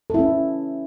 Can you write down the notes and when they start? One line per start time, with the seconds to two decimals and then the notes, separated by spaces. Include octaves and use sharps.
0.10 A4
0.14 E4
0.19 C#4